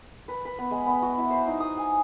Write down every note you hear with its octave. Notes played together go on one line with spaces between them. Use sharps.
B4
B4
B3
G#3
B3
F#4
E4
C5
D#4
D#6
G#5